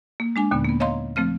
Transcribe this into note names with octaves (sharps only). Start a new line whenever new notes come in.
A#3
G#3 D4 G#5
D#2 A#2 D3 B3
A#3 B3
C#5 D#5 F5 A#5 C6
F3 A3 C4 F6